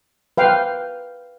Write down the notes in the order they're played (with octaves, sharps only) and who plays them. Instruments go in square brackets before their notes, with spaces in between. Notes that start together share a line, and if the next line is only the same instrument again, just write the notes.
[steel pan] B4 F5 G5